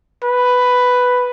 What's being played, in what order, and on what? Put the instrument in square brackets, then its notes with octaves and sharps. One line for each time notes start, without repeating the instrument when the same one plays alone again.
[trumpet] B4